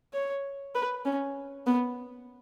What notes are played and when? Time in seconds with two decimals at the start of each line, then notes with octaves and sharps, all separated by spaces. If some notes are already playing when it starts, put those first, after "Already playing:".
0.13 C#5
0.75 B4
1.05 C#4
1.67 B3